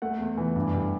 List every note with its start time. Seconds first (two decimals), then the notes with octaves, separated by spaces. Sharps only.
0.02 A3 F#5
0.19 E2
0.38 E3
0.56 G2
0.73 G2